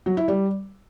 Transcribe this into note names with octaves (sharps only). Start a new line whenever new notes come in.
F#3
E4
G3